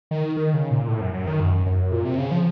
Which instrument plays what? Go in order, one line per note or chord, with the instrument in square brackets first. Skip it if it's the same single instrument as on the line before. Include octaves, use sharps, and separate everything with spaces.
[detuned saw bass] D#3
D#3
C#3
A#2
A2
F#2
F#2
D#3
F#2
F#2
A#2
C3
C#3
F3